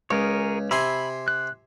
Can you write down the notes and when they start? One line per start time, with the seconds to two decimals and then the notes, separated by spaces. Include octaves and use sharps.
0.11 C#2 G#4 A#4 C#5
0.71 C3 G#5 B5 C6 E6
1.28 F#6